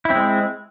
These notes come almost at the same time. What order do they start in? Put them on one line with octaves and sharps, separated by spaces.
E4 C4 G#3